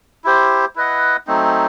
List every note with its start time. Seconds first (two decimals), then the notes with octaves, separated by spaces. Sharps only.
0.24 E4 G4 C5
0.76 E4 B4 D#5 F#5
1.27 F#3 A3 C4 D#4